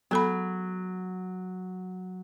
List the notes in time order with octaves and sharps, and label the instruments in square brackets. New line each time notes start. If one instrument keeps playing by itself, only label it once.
[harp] F#3 [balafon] B3 A4 B5